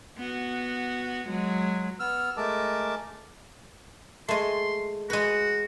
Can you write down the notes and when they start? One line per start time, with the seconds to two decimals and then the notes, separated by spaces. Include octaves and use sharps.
0.18 B3 F#4
1.29 F#3 G#3
2.00 B3 E6 F6
2.37 G#3 A3 A#4 A5 D6
4.29 G#3 A3 C6
5.10 G#3 F#4 B4